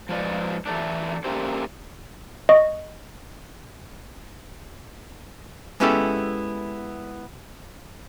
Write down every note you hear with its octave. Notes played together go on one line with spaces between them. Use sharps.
F3 G#3 F4 B4 D5 D#5
E3 F#3 A3 D4
D3 A#3 C#4 E4 G4 C5
D#5 C#6
G#3 B3 C#4 E4 G4 A4